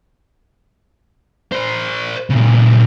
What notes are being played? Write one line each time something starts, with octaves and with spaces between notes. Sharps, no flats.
A#4 C5
A#2 C#3